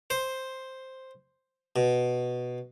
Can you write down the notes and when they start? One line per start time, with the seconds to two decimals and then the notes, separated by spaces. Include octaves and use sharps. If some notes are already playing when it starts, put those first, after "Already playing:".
0.10 C5
1.76 B2